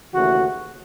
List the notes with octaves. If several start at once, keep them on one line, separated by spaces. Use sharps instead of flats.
D#2 C#3 E3 A3 F#4